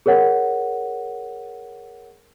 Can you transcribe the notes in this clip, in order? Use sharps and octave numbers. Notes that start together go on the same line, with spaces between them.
G#4 A#4 C#5 F#5